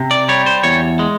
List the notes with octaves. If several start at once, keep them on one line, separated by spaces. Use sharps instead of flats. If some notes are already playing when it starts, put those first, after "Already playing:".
Already playing: C3
D5
G3 C#5
C5
E2 C#5
G#3